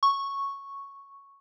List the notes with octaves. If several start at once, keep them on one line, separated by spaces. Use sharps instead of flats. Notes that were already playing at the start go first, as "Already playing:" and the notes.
C#6